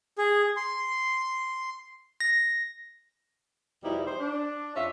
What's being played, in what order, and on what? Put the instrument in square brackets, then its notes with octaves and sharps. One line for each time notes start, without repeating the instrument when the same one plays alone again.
[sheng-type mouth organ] G#4
C6
[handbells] A#6
[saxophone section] E2 B2 F3 G3 D#4 E4
C5
D4
F2 C#4 F4 E5